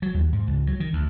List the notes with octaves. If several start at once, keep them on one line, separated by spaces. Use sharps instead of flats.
F#3
D#2
G#2
C#2
F#3
D#3
D2